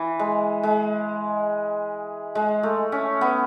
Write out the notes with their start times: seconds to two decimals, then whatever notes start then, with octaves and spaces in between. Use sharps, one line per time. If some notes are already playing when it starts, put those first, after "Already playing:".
Already playing: E3
0.19 G#3
0.63 G#3
2.35 G#3
2.63 A3
2.92 C#4
3.21 B3